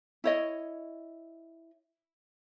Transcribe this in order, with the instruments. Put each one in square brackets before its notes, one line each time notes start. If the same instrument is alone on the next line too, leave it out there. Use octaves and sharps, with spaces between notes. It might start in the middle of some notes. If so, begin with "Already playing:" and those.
[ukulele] E4 C#5 D#5